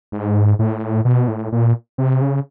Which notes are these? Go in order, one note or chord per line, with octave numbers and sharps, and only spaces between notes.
G#2
A2
B2
A2
A#2
C3
C#3